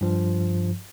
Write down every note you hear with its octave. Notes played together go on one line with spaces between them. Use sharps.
G2 F3